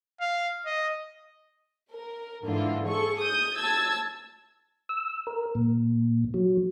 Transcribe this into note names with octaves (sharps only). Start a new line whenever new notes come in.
F5
D#5
A#4
G#2 D3 E3 F4
G#4 A4 C#6
D#6 G6
A5 E6 G#6 A6
E6
A#4
A#2
F#3